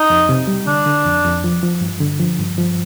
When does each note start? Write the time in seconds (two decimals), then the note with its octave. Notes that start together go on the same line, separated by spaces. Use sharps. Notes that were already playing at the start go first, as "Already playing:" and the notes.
Already playing: D#4
0.10 F2
0.29 C3
0.47 G3
0.67 D3 D4
0.86 D3
1.05 F2
1.25 F2
1.44 F3
1.63 F3
1.81 G2
2.01 D3
2.20 F3
2.39 G2
2.58 F3